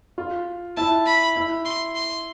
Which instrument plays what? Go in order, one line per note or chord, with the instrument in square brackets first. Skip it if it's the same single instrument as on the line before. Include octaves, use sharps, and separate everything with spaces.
[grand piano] F4
[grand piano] E4 [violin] A5
[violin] B5
[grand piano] E4
[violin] C6
C6